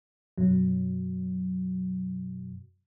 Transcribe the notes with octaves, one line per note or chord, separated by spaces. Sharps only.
F#2 B2 F#3